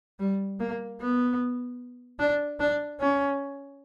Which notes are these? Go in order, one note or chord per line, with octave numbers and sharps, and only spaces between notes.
G3
A#3
B3
D4
D4
C#4